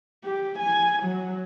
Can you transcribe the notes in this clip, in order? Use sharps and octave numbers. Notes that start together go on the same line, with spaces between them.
G4
G#5
F#3